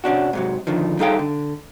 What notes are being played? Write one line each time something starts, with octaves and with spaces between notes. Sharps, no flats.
C3 C#4 D4 F#4
G#2 C3 F#3
F2 D3 D#3 F3
G3 D#4 G#4 A4 F5 G5
D3